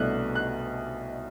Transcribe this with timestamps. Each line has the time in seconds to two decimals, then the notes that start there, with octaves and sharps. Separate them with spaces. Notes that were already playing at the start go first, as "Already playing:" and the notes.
Already playing: C2 B2 A3 D4 F#6
0.35 F#6